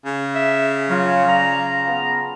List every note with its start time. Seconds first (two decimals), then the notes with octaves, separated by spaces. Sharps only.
0.06 C#3
0.35 E5
0.89 F#3 C#4 F4 F5
1.29 D5 A#5
1.87 B3 A5